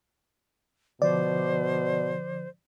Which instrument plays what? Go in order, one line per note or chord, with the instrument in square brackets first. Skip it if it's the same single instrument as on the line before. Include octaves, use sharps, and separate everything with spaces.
[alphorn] B2 [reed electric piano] D3 F3 [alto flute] C5 [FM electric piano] D5